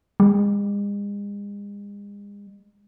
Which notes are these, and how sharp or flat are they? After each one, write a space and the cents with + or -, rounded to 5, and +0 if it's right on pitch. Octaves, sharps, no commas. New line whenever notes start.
G#3 -40